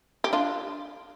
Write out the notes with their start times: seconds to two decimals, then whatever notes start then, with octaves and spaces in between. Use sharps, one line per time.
0.24 G4
0.33 D4 F4